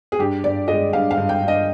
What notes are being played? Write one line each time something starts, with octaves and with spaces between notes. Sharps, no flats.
G#4
G2 G4
G2 D5
G#3 D#5
G2 F5
F5
G2
G5
G2
D#5